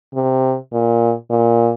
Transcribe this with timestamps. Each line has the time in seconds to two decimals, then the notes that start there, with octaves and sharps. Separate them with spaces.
0.15 C3
0.73 A#2
1.30 A#2